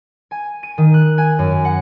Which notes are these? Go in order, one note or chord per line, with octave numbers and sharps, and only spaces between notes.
G#5
D#7
D#3
F#6
G#5
F#2
F#5